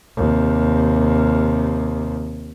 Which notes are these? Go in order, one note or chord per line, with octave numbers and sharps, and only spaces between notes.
D#2 C3